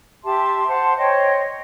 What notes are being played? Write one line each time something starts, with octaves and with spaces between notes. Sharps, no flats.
G4 E5 A5 C6
C5 F#5 A5
C5 C#5 D#5 G5